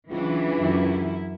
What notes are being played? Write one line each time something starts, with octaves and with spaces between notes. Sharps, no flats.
C#2 E3 F#3 D4
F#2 C#4 E4